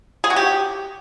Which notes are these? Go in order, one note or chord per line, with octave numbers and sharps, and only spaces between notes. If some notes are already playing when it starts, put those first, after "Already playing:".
G#4
F#4
G4